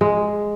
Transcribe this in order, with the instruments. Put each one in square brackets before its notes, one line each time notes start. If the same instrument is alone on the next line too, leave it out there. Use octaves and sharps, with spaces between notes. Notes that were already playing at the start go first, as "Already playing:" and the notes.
[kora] G#3